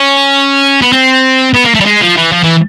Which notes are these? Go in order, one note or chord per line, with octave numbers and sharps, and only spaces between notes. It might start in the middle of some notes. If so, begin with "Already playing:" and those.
Already playing: C#4
B3
C4
B3
A#3
A3
G3
G#3
F3
E3
F3
E3